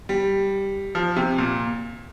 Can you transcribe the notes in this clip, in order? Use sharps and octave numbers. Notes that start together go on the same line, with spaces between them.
G3
F3
C3
A#2